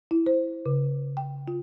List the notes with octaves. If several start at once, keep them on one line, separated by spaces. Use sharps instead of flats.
E4
C5
C#3
G5
F4